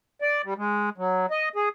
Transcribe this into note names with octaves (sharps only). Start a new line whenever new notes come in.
D5
G3
G#3
F#3
D#5
G#4